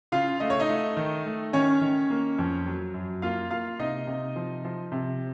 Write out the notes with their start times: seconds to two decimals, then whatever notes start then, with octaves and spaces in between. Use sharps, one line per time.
0.12 C#3 F4 F5
0.40 A3 D#5
0.50 C#5
0.60 D#4 D#5
0.69 A3
0.97 D#3
1.26 A3
1.53 D#3 C#4 C#5
1.81 D#3
2.10 A#3
2.39 F2
2.66 F#3
2.94 F#2
3.22 A#3 F4 F5
3.51 A#3 F4 F5
3.79 C3 D#4 D#5
4.07 C3
4.36 F3
4.65 F3
4.92 C3